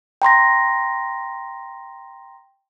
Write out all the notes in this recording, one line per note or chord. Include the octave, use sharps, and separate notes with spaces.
G5 A#5 C6 A#6